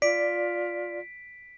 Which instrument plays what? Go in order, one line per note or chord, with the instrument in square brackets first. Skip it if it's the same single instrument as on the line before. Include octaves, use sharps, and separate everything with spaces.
[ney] F4 [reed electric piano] D5 [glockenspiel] B6 D7